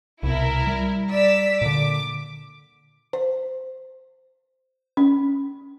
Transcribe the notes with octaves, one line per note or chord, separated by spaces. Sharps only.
C2 B2 E4 A#4
G3
D5 E6 B6
A#2 D3 D6
C5
C#4